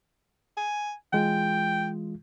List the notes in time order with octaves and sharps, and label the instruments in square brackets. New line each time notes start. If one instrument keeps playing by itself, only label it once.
[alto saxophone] G#5
[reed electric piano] E3 G#3 F4 [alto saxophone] G5